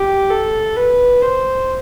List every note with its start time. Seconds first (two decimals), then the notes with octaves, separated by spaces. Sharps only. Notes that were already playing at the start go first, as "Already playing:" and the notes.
Already playing: G4
0.30 A4
0.76 B4
1.22 C5